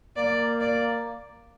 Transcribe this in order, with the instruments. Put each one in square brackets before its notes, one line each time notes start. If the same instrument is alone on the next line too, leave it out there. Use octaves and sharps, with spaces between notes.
[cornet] A#3 [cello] D5
[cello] D5